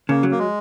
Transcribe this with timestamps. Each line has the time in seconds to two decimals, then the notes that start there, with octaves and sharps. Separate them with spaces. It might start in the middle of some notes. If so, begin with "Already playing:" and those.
0.09 C#3 A#3
0.23 F#3
0.31 A#3
0.39 G#3